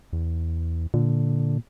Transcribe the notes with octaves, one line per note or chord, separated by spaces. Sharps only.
E2
A#2 D3